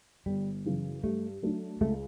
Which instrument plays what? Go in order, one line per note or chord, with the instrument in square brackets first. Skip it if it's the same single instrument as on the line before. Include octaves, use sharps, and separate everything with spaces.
[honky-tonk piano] G1 [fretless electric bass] G3
[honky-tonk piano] F#2 C#3 E3
[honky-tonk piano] G2 [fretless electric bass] A3
[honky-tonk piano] F#3 A3 D4
[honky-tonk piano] C#2 [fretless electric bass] A3